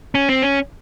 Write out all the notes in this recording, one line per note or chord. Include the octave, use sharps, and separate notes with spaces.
C#4
C4
C#4